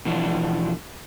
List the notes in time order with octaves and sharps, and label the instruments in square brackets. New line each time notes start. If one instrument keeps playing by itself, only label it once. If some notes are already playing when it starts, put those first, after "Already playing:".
[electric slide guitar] B2 E3 F3 D4